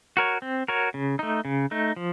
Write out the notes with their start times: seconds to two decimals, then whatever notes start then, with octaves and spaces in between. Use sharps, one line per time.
0.17 F#4 A#4 C#5
0.42 C4
0.68 F#4 A#4 C#5
0.94 C#3
1.19 A3 D#4
1.45 C#3
1.71 A3 D#4
1.96 F3